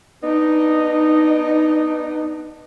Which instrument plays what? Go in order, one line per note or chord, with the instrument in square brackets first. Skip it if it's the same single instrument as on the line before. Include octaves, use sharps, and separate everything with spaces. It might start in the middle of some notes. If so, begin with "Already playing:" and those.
[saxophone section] B3 D4 D#4